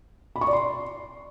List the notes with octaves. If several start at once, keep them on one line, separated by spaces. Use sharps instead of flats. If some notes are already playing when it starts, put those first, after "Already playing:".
B5
C#6
D5
C6